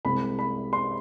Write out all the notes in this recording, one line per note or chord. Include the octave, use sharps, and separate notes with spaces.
C2 C3 G#3 B5
B5
C6